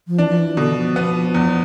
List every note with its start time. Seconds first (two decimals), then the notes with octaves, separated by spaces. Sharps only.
0.08 F3
0.18 E3 D4
0.29 F3
0.38 E3
0.57 B2 D3
0.77 F3
0.96 B3
1.35 E2